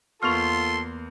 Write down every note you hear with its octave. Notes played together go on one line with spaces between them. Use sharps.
E2 A#3 F4 A4 C6 C#6 F6 F7